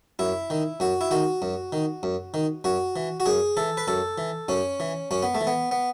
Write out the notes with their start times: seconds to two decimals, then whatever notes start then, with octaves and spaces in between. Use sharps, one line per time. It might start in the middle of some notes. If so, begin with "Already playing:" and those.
0.19 F#2 E4
0.50 D#3
0.80 F#2 F#4
1.01 E4
1.11 D#3 F#4
1.42 F#2
1.73 D#3
2.03 F#2
2.34 D#3
2.64 F#2 F#4
2.96 E3
3.20 F#4
3.26 F#2 G#4
3.57 E3 A4
3.77 B4
3.88 F#2 A4
4.18 E3
4.48 F#2 C#4
4.80 E3
5.11 F#2 C#4
5.23 B3
5.35 A3
5.41 E3
5.47 B3
5.71 B3